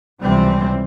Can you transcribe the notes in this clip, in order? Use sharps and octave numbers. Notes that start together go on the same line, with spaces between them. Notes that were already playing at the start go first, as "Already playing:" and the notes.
C#2 C3 E3 F3 G3 C4